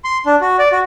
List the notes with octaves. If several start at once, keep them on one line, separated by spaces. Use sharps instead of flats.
C6
D4
F#4
D5
F#4